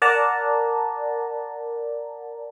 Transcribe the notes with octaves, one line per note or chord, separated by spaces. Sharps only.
A#4 D5 F#5 A5 A#5